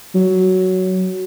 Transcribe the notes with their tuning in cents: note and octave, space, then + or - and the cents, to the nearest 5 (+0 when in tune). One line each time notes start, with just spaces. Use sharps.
F#3 +5